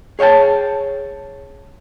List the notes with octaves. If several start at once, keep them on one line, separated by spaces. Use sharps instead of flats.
G#4 C#5 F5 G5 A5